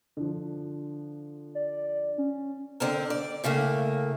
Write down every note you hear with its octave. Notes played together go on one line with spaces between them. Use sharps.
D3 F3
D5
C#4
D3 C4 A#4
D5
A2 C#3 A3 A#3